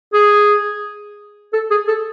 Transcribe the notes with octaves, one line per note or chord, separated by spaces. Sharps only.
G#4
A4
G#4
A4